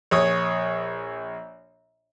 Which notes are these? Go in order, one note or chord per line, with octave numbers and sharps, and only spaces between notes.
A#1 C#5 D#6